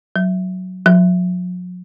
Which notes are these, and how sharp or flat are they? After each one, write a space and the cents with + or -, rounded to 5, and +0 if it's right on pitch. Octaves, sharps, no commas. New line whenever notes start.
F#3 +0
F#3 -45